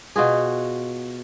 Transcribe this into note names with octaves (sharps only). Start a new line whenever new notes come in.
B2 F4 F#4 G#4